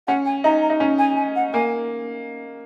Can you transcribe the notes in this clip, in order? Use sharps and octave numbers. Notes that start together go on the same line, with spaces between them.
C#4 F#5
G#5
D#4 A#5
A#5
D#4
C#4
G#5
G#5
F#5
A#3 G#5